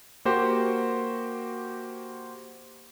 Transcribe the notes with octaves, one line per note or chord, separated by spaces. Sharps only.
A#3 F#4 G4 C5